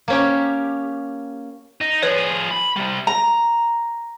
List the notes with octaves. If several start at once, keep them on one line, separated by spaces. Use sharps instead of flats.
A#3 C#4 G4
D#4
F3 G#4 B4 C#5
B5
C3 G3
A#5